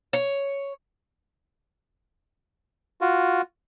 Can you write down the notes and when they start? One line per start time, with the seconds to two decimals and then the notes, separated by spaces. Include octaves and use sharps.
0.13 C#5
3.01 F4 F#4